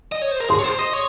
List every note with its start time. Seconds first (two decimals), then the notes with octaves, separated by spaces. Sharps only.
0.12 D#5
0.22 C#5
0.31 C5
0.40 A#4
0.50 G#4 C6
0.59 C#5
0.64 C5
0.79 D#5
0.93 C#5